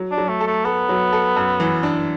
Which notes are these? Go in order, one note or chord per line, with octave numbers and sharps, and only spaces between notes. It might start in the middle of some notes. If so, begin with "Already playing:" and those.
Already playing: F#3
D4
F#3
A3
A4
A3
B3 A4
F#3
A4
F#2
E3
D4